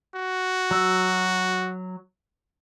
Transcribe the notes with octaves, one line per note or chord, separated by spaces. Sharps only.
F#4
F#3 E6